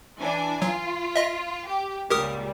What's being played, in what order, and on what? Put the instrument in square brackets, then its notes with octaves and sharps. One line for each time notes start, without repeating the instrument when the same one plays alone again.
[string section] E3 D4 G#5
[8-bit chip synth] F#3 [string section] F4
[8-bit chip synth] D#5 E5
[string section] G4
[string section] C#2 A#2 G3 [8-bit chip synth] G4 A#4 D#6